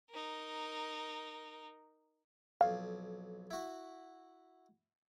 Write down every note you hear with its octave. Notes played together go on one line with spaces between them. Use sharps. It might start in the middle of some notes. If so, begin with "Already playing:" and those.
D#4 A#4
B1 F2 F5
E4 F#4